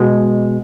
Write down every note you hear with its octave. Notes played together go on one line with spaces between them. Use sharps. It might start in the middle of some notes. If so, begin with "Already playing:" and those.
Already playing: B2 G#3